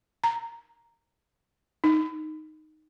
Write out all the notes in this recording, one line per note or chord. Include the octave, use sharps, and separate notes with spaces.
A#5
D#4